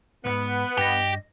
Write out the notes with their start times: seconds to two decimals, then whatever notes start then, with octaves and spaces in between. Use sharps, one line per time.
0.25 B1 G#2 B3
0.78 G2 G4 D#5